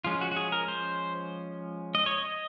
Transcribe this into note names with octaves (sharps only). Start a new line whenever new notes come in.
F3 G#3 C#4 F4
F#4
F#4
G#4
A#4
C5
D#5
C#5
D#5